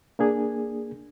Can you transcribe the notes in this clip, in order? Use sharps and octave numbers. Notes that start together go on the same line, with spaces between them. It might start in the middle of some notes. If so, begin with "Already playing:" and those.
A#3 D4 G#4